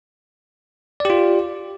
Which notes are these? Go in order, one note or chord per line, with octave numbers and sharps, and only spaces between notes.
F4 G4 D5